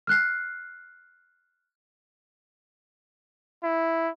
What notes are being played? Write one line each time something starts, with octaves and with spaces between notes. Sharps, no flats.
F6 F#6 C7
E4